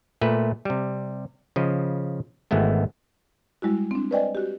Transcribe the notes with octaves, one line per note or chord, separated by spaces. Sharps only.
A#2 A3 B4
C3 G3
C#3 F3 D#5
G#1 E3 G#3 A3 B3
G3 G#3 E4 F#4
C4 D4
B4 C5 D5 D#5 G5 G#5
F#4 G4